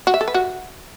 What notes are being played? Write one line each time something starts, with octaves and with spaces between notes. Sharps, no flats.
F#4
E5
A4
B4
F#4